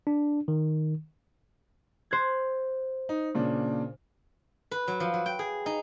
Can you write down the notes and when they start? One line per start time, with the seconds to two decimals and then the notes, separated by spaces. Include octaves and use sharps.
0.07 D4
0.48 D#3
2.11 C5 F#6 G#6
3.09 D#4
3.35 A#2 C#3 D4
4.71 B4
4.88 F#3
5.00 F3
5.14 F#3
5.26 G5
5.39 G#4
5.66 D#4